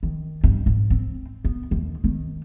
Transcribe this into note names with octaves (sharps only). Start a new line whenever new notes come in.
D#3
G2
G#2
C4
B3
D#2
D#3